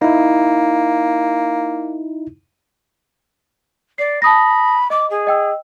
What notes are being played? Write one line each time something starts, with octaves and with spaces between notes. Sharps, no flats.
A#3 D#4 E4
D5 C7
A5 B5 D#6 A#6
D#5 D6
G#4
D#5 G5 E6